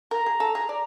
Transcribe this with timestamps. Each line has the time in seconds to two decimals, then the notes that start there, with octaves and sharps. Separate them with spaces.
0.11 A#4 A#5
0.26 G#4
0.40 A4
0.55 G#4
0.69 D5